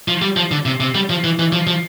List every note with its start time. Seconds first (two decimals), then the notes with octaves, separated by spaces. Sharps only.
0.08 F3
0.22 G3
0.37 F3
0.51 D3
0.66 C3
0.80 C3
0.95 G3
1.10 F3
1.24 E3
1.39 E3
1.52 F3
1.67 F3